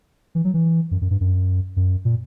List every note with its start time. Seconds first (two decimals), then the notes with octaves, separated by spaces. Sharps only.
0.35 E3
0.44 F#3
0.54 E3
0.91 F#2
1.01 F#2
1.10 G2
1.21 F#2
1.76 F#2
2.05 A#2